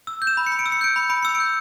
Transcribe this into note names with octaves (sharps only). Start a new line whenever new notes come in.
E6
G6
E7
B5
C#7
B5
D7
E6
C#7
G6 D7
B5 C#7
B5 D7
E6 C#7
D7
G6